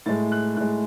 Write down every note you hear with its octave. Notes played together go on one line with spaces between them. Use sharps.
A2 G#3 A6
F#6
A2 G#3 F#6